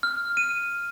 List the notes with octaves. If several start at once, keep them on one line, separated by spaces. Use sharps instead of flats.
F6
D#7